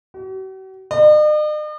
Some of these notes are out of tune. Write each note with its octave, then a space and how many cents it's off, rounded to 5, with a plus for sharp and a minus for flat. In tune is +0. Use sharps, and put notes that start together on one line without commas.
F#4 +45
D#5 -45